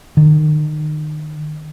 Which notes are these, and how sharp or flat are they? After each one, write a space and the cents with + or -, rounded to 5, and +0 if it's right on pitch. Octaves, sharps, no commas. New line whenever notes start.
D#3 -30